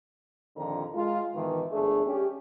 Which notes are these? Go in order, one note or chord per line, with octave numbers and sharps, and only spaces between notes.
A#1 F2 D3 D#3 A#5
G#3 F4
G#2 B2 D#3 E3
G1 F#2 A3 D4 G#4
C#4 G4